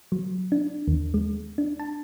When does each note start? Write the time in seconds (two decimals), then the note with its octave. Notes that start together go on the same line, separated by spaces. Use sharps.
0.12 F#3
0.52 D4
0.88 D#2
1.14 G#3
1.58 D4
1.80 A5